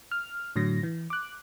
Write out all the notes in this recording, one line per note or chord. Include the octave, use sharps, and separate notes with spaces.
F6
A2 D3 F#3 A#6
E3
D6 F#6